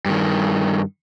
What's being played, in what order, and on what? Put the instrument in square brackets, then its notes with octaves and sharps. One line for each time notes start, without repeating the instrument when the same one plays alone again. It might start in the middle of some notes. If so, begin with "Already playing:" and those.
[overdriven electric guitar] G2 D#3